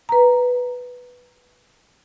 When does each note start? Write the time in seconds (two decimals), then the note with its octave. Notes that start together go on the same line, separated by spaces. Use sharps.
0.09 B4 A#5